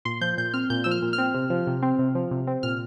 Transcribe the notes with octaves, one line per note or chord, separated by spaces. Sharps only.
A#2 C6
F3 G6
A#2 G6
C4 F6
A#2 G6
F3 E6
F6
A#2
F6
C4
C3
F3
C3
C4
C3
F3
C3
C4
A#2 F6